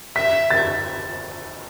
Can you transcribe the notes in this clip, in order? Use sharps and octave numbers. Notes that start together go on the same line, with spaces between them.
E5 B6
A6